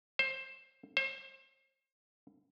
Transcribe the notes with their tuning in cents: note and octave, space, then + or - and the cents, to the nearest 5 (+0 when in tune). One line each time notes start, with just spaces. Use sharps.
C5 +20
C5 +35